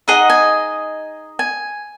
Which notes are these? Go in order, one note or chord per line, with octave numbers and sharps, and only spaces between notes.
D#4 G#4 D#5 F#5
G#5
G#5